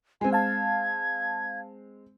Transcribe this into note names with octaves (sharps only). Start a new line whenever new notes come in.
G#3 C4 G#5
F5 A5 G#6